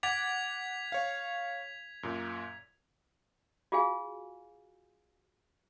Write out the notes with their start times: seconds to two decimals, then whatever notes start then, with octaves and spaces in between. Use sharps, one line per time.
0.03 F#5 D6 G#6 A6 B6 F7
0.92 C#5 F5
2.03 F#2 A#2
3.72 F4 F#4 G#4 F5 G#5